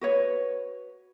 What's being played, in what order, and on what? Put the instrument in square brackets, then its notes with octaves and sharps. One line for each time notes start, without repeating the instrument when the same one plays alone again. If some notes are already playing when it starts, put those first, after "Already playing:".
[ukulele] F#4 B4 C#5